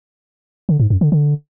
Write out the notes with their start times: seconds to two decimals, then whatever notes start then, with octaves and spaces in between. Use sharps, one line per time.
0.69 D3
0.80 G#2
0.90 F#2
1.01 D3
1.12 D3